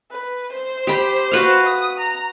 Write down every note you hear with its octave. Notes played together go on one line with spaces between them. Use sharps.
B4
C5
G4 B5
F#4 B4 F5
D#6
A#5